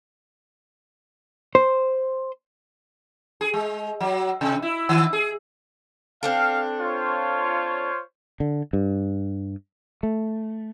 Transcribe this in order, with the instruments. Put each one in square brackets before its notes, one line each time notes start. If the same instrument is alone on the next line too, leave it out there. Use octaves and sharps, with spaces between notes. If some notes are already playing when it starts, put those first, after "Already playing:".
[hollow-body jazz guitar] C5
[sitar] G#4
G#3
F#3
C3
E4
D#3
G#4
[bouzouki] C4 D4 A4 [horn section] F5
[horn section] F4 C5 C#5
[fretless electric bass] D3
G2
A3